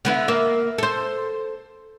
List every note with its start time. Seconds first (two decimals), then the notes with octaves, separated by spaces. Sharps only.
0.05 D3 B3 E4
0.28 A#3 E5
0.78 A4 C5